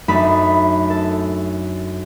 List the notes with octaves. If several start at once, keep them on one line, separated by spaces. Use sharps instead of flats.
F#2 A3 D4 D#4 B5
A4